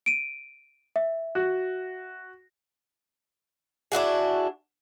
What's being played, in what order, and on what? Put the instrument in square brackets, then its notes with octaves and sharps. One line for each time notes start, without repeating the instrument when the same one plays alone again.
[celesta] D7 D#7
E5
[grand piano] F#4
[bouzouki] D4 E4 F#4 G#4